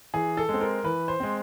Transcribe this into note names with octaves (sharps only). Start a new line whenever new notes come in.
E3 G#4
A4
G#3 C4
A#4
E3 B4
C5
G#3 C4